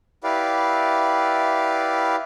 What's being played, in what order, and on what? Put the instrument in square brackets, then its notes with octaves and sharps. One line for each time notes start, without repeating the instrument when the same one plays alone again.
[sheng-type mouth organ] E4 G4 B4 D5 F5